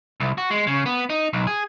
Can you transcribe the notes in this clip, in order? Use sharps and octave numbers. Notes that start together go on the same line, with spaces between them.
C2
F#4
G#3
C#3
B3
D#4
B1
G#4